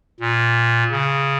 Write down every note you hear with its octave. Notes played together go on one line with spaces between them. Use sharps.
A#2
C#3